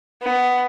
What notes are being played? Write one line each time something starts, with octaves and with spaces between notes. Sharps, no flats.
B3